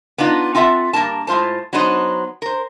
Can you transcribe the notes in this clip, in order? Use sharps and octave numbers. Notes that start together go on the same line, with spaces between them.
B3 D4 D#4 F4
C4 F4 A4 E5 F#5
G2 E3 A#3 A#4 A5
A2 G#3 F4 C5 A5
F#3 B3 D4 D#4 C5 D#5
A#4 C5